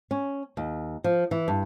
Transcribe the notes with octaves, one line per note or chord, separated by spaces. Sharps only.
C#4
D#2
F3
E3
G2